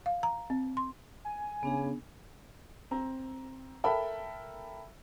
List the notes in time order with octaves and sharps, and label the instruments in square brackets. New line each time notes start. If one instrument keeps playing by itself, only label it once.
[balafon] F5
A#5
C4
C6
[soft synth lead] G#5
[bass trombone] C#3 [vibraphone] B3 D4 G#4
[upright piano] C4 A#5
A4 A#4 E5 G5 B5